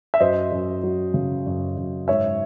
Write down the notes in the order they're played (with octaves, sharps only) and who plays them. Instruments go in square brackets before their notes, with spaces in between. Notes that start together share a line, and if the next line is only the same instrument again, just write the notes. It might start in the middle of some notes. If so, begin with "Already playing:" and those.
[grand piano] E5
F#2 C5 D#5
F#2
F#3
C#3
F#2
F#2
G#2 C#5 E5